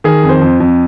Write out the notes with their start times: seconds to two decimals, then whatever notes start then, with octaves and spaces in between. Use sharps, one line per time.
0.04 D#3 G#4
0.23 F2
0.29 C5
0.41 F2
0.60 F2